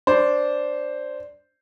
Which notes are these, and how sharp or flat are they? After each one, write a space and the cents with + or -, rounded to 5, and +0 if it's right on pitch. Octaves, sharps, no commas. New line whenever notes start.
D4 -10 C5 +0